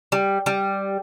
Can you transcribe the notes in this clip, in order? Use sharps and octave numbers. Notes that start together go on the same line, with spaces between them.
G3
G3